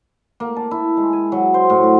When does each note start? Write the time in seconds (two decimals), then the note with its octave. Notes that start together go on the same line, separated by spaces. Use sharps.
0.40 A#3
0.56 A5
0.71 E4
0.97 G#3
1.13 G#5
1.32 F#3
1.54 C5
1.70 A2
1.83 F#4